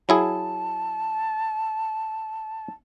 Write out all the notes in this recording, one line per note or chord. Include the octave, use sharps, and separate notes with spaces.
F#3 E4 G#4 A5